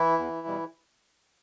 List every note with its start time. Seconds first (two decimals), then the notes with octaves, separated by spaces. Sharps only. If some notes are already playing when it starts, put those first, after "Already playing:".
Already playing: E3 E4
0.18 E2
0.47 B2 G3